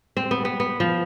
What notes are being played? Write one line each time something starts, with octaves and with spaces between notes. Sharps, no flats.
C4
B3
B3
B3
F3